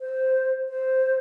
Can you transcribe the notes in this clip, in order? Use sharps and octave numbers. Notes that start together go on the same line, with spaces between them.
C5
C5